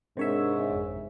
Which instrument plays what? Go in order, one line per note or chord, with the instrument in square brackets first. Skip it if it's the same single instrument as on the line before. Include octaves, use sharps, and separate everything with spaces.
[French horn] G#2 [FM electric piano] C3 C#5 E5 [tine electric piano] D4 A#4 C5
[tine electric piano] G1 F2